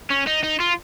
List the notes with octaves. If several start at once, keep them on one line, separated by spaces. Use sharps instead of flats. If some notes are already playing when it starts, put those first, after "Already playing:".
C#4
D#4
D#4
F4